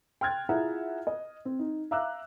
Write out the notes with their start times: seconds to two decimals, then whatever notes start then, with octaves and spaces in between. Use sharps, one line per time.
0.21 G5 C6 F6 F#6 G#6 A6
0.49 E4 F4 G#4 E5 F#5 A#5
1.07 D#5
1.45 C4
1.59 D#4
1.91 E5 F5 A#5 D6 E6 F#6